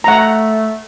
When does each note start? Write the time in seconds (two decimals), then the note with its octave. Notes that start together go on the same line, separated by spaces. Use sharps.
0.04 A3 F#5 A#5